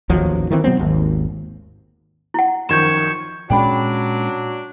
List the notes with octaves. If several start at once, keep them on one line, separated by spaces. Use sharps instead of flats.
A1 D#2 F3 F#3
D#3 E3 G#3 C4
B2 F#3 B3 C4
G#1 D#2
E4 F#5
F#2 D#3 F3 C#6 G6 G#6 E7
A#2 F#3 G#3 C#4 D4 G5 B5